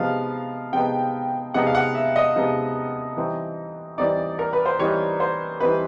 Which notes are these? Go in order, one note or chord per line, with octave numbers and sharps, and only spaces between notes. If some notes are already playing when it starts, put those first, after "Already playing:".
Already playing: C3 F3 G#3 B3 D#4 F5
C3 F3 G#3 B3 D#4 G5
C3 F3 G#3 B3 D#4 F#5
F5
F#5
E5
D#5
C3 F3 G#3 B3 D#4
E3 G3 C4 D#4
E3 G3 C4 D#4 D5
A#4
B4
C5
E3 G3 C4 D#4 C#5
C5
E3 G3 C4 D#4 B4